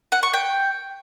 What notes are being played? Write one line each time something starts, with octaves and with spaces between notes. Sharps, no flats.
F#5
C#6
G5